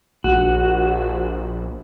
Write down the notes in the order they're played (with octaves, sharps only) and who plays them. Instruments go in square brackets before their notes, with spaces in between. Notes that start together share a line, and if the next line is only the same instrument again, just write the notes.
[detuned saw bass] A#1 [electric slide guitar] F#4